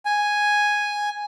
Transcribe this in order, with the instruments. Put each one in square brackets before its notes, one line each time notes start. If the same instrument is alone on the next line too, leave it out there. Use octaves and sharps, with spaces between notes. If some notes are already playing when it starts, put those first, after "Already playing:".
[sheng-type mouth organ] G#5